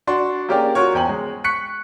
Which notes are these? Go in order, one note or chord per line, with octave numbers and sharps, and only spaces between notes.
D4 F#4 C6
A#3 C#4 G4 G#4 A#4 D5
F4 F#4 A#4 C#5
E2 C5 G5 G#5 F#7
G#3
C#6 F#6 B6 C#7